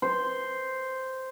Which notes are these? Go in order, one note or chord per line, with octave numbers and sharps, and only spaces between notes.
C5